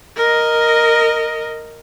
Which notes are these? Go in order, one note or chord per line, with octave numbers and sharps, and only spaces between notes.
A#4 D#5